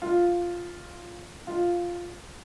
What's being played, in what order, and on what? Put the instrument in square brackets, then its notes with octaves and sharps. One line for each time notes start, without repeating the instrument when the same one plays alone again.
[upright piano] F4
F4